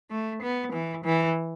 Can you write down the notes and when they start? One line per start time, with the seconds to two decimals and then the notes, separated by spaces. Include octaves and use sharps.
0.10 A3
0.42 B3
0.73 E3
1.05 E3